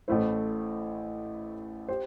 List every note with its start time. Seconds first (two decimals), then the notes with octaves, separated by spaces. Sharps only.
0.08 A1 A2 A3 E4 C5
1.88 G4 C5